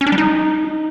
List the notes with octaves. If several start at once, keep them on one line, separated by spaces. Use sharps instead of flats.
C#4
D4
G3
D#4